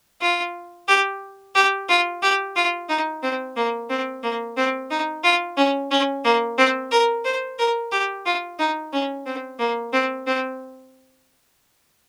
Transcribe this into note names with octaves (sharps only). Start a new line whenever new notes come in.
F4
G4
G4
F4
G4
F4
D#4
C4
A#3
C4
A#3
C4
D#4
F4
C#4
C#4
A#3
C4
A#4
C5
A#4
G4
F4
D#4
C#4
C4
A#3
C4
C4